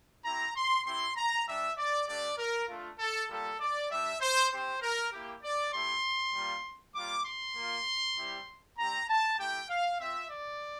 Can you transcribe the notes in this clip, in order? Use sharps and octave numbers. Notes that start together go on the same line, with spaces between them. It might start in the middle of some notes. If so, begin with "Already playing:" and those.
C4 E4 G4 A#5
C6
C4 E4 G4 C6
A#5
G3 D4 G4 E5
D5
A3 D4 G4 D5
A#4
A3 D4 F4
A4
G3 A#3 F4 A4
D5
G3 D4 G4 E5
C5
C4 G4 C5
A#4
A#3 E4 G4
D5
A3 E4 G4 C6
G3 A#3 F4
G3 A#3 F4 D6
C6
A#3 F4
G3 C4 E4 G4
G3 C4 G4 A#5
A5
A3 E4 G4 G5
F5
C4 F4 E5
D5